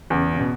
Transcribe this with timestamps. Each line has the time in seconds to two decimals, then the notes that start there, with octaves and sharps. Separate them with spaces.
0.10 E2 C#3
0.33 C#3
0.39 B2